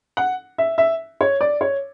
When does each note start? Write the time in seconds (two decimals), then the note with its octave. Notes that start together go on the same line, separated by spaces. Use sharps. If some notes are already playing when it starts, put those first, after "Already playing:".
0.17 F#5
0.58 E5
0.78 E5
1.21 C#5
1.41 D5
1.61 C#5